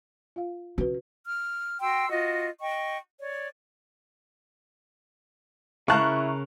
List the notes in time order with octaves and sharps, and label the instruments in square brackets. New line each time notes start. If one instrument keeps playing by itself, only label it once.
[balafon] F4 F5
[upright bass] C#3 [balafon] F#4 B4
[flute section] F6
F#4 G5 C6 E6
F4 F#4 D#5
D#5 G5 C#6
C#5 D5
[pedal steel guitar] C#3 A#4 [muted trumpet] E4 [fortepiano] F5 A5 A#5 [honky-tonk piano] C#6 F#6